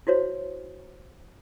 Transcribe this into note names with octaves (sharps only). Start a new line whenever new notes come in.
E4 F#4 C5 C#5